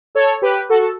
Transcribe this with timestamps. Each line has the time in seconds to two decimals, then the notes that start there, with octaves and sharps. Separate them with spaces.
0.15 A4 C#5
0.42 G4 B4
0.69 F#4 A4
0.82 A4